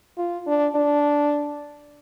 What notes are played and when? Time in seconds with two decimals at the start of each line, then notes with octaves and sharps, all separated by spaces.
0.17 F4
0.47 D4
0.75 D4